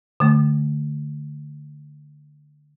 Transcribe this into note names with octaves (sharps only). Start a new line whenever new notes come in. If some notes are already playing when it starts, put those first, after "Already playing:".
D3 A3